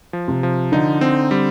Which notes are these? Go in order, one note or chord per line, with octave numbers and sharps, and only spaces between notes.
F3
C3
F3
D3 D#4
C4
G3